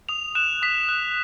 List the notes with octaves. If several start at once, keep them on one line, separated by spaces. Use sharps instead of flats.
D#6 F7
F#6 E7
D#6 B6
F#6